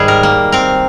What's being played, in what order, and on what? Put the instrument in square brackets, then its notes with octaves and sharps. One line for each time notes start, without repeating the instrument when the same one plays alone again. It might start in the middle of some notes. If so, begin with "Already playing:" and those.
Already playing: [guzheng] G#2 D#3 G3 G#4
A#4
A#3
C4 A#4